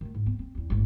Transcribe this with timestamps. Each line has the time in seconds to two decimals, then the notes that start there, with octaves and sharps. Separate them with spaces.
0.01 D#3 A3
0.14 G#2
0.26 B3
0.39 C4
0.55 E2 C4
0.70 G#1 A2